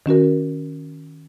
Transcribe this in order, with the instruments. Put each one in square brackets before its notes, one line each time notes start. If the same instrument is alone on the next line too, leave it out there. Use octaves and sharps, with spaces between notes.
[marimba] D#3 C#4 F#4 A#4